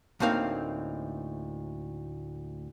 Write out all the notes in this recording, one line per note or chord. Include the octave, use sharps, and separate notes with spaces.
D2 A2 A#3 C4 D#4 F5